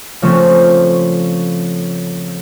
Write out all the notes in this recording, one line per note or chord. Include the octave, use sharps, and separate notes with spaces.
C#3 F3 A3 C4 C#4